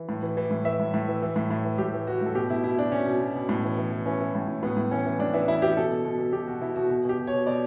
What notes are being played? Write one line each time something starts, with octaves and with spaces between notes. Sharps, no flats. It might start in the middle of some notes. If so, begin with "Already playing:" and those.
Already playing: E3
A2
E3
E3
A2
E3 E5
A2
A2
E3
E3
A2
A2
E3
A2 G4
E3
E3 F#4
A2 A4
B2 G4
B2 E4
B2 E4
B2 D4
B2 C#4
B2
B2
B2
A2
E3
E3
E3
E3 C#4
E3
A2
A2
A2 B3
A2
E3 C#4
E3
A2 D4
E3 E4
E3 E4
E3 G4
B2 A4
B2
B2
B2
B2 G4
B2 F#4
B2 E4
B2 F#4
B2
B2 G4
B2
C#5
B2
B2 D5